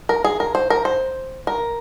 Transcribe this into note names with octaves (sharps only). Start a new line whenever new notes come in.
A#4
G#4
A#4
C5
A#4
C5
A#4